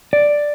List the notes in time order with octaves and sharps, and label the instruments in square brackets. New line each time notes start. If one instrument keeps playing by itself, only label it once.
[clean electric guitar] D5